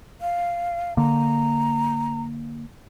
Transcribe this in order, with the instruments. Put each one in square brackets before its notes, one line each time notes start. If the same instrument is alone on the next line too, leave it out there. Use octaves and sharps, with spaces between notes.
[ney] F5
[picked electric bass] D3 A#3 [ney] A#5